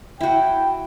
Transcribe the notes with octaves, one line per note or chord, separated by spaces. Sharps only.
E4 F#4 G5